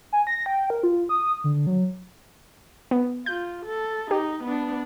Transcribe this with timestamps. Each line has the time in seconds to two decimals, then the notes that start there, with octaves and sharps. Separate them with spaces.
0.13 G#5
0.27 A#6
0.46 G5
0.70 A#4
0.83 F4
1.09 D#6
1.44 D3
1.67 F#3
2.91 B3
3.26 F4 G6
3.65 A4
4.11 D#4 G4
4.44 B3 D4